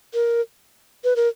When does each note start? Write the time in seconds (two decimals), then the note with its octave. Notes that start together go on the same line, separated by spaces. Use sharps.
0.14 A#4
1.04 B4
1.16 A#4